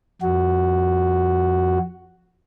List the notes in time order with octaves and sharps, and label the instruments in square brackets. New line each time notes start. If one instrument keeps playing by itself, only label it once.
[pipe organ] F2 F#4